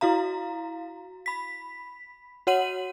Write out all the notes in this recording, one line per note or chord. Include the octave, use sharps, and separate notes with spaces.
E4 F#4 F5 A#5
B5 B6
F#4 C#5 F#5 D#7 F#7